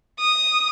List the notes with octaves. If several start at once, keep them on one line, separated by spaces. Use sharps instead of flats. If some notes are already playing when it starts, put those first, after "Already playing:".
D#6